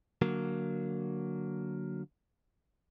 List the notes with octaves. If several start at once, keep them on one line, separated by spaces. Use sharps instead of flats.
D3 F#3 A#3